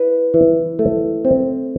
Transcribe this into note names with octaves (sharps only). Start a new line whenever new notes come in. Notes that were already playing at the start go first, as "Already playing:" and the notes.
Already playing: E4 B4
E3
A3
C4